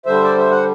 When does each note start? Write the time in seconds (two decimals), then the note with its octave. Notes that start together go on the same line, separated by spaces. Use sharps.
0.06 D3 G3 C5 E5
0.24 D5
0.38 E5
0.51 F#5